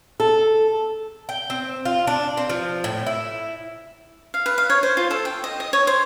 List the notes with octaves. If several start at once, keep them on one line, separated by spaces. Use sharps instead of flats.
A4
G5
C4
F4
D4
C4
F3
A2
E4
F5
B4
F5
C#5
C5
F4
A4
G5
D#5
D#5
C#5
C5